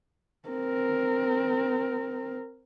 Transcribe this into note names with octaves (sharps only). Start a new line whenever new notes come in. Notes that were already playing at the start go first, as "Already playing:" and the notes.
C4 A#4